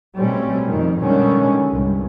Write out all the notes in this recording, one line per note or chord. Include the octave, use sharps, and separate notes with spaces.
B2 G3 A3 C4 C#4
F2 D#3
B2 D3 D#3 G3 G#3 C#4
C2 G2